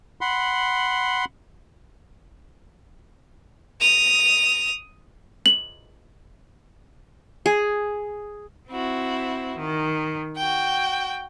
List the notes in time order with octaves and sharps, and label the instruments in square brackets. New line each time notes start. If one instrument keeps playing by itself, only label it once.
[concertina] F#5 B5 C6
[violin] D#6 F7
[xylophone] F#7
[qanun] G#4
[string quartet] C4 E4 F#4
D#3
F#4 G5